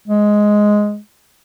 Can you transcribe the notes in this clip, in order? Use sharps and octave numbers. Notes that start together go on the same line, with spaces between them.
G#3